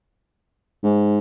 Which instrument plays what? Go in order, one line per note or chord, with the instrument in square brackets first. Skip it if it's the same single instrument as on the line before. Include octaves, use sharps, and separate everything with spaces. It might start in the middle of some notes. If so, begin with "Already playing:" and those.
[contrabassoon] G#2